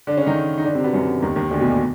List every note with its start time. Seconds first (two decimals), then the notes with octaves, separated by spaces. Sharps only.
0.07 D3 D4
0.17 C#3 C#4
0.26 D#3 D#4
0.58 D#4
0.64 D3 D4
0.75 C3 C4
0.84 B2 B3
0.93 F#2 F#3
1.22 D#2 D#3
1.36 D#2 D#3
1.51 D2 D3
1.60 B1 B2
1.69 A#2
1.77 B2